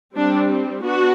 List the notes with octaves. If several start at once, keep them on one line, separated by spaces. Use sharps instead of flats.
G3 C4 D4
B3 D4 F#4